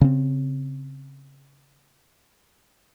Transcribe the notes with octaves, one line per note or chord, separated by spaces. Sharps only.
C#3 C4